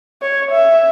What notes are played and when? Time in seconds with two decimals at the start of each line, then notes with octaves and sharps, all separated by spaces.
0.22 C#5
0.51 E5